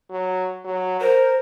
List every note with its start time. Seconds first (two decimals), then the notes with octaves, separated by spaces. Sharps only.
0.10 F#3
0.65 F#3
1.01 A#4 C5